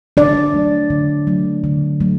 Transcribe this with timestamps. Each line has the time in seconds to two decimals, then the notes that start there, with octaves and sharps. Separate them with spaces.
0.17 D3 D4 D5
0.54 F#3 A3
0.90 D3
1.27 F#3 A3
1.64 D3
2.00 F#3 A3